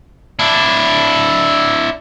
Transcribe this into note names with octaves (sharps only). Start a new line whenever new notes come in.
D4 E4